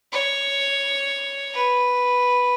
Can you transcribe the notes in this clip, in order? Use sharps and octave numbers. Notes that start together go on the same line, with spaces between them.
C#5
B4